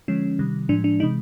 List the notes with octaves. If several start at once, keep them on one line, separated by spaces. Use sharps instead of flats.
D3 F3 G#3 C#4
C3 D#3 G3
A2 F3 G#3 D4
D4
C3 E3 G#3 D#4